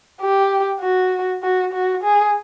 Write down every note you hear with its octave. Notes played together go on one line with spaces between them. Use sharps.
G4
F#4
F#4
F#4
G#4